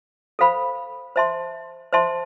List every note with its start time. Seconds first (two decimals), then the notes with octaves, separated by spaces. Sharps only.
0.39 A4 C5 F5 B5
1.16 C5 E5 A5 C6
1.93 C5 E5 A5 C6